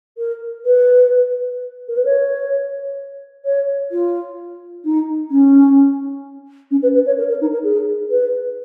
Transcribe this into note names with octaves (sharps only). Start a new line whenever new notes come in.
A#4
B4
A#4
B4
C#5
C#5
F4
D#4
C#4
C#4
B4
B4
C#5
A#4
A#4
D#4
A#4
G#4
B4